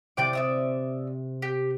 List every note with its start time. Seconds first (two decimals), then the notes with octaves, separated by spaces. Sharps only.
0.17 C3 D5 G5 D6
0.33 D5 E5 D#6
1.42 G4